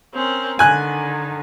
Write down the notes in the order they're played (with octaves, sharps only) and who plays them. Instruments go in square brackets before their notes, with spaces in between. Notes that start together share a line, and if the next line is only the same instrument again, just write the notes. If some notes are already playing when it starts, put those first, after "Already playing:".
[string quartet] C4 C#4 A#4
[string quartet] D3 D#3 [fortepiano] G#5 F#6